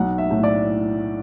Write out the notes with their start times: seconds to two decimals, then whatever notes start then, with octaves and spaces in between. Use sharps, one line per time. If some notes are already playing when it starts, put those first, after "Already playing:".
Already playing: B1 F#5
0.18 E5
0.31 A2
0.43 D5